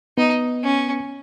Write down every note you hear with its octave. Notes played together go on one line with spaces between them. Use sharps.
B3 D#4
C#4